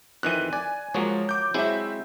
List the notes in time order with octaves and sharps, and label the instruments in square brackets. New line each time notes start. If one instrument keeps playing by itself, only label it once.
[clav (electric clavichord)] F2 D#3 E3 [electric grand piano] F#6 D#7
[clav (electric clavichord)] D5 [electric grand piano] G#5
[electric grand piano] F3 G#3 [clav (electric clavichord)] F#3 A#3 C#5
[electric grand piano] D6 G6
[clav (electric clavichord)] F#3 G#3 E4 [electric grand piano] C4 E5